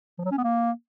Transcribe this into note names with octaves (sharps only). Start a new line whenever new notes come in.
F3
F#3
C#4
B3
A#3